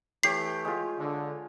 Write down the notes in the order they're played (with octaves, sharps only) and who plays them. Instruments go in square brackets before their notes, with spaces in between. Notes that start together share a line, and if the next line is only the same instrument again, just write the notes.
[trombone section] E3 A3 [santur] G4 C#5 [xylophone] C7
[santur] G#3 F4
[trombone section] D3